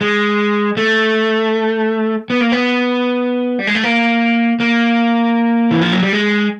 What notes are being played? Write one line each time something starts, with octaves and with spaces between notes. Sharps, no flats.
G#3
A3
B3
A#3
B3
G3
G#3
A3
A#3
A#3
E3
F3
F#3
G3
G#3